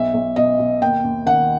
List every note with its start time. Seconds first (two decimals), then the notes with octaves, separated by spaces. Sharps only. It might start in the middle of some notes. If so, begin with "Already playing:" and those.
Already playing: B1 E5
0.14 B1
0.36 B2 D#5
0.59 B2
0.81 D#2 G5
1.04 D#2
1.26 D#3 F#5